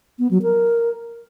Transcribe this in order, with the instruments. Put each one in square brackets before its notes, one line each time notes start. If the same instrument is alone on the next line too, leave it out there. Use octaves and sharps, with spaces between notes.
[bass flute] B3
F#3
A#4